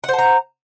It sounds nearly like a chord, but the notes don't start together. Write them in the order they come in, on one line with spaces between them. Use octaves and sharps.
F#5 C5 A5 A#5